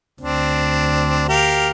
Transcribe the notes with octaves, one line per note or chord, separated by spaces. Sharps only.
D2 C4 D4
G4 A#4 F5